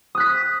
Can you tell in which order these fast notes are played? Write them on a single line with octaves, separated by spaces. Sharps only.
D#6 F#6 B6